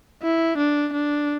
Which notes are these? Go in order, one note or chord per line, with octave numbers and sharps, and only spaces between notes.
E4
D4
D4